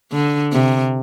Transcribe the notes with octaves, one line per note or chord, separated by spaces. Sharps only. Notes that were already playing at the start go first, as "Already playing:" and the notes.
D3
C3